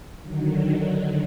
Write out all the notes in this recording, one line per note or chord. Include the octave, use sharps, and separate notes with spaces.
D3 D#3 F#3